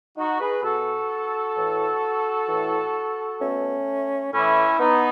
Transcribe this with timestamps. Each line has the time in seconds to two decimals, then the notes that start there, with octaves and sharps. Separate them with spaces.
0.17 D#4 F#4
0.40 G#4 B4
0.63 B2 F#4 A4
1.56 A2 E3
2.48 A2 E3
3.41 B2 A3 C#4
4.33 A2 E3 C#4 E4
4.79 B3 D#4